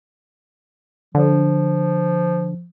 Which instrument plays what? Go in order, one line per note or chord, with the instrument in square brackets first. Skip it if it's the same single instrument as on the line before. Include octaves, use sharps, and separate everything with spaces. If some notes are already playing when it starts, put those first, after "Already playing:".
[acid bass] D3 [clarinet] F3